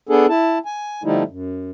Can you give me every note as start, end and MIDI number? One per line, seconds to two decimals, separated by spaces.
0.09 0.26 59
0.09 0.26 62
0.09 0.26 68
0.09 0.26 69
0.29 0.58 64
0.29 0.58 81
0.65 1.02 80
1.04 1.23 50
1.04 1.23 53
1.04 1.23 55
1.04 1.23 57
1.04 1.23 63
1.04 1.23 64
1.28 1.71 42